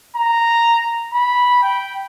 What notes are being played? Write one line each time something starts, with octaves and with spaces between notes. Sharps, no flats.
A#5
B5
G5